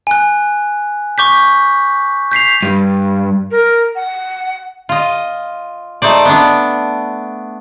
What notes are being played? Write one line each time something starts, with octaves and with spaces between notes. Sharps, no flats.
G#5 F#6
C#6 D6 G6 B6
G6 B6 C7 F7
G2
A#4
F#5
F4 D#5
A3 D#4 C5 D5
B3 D4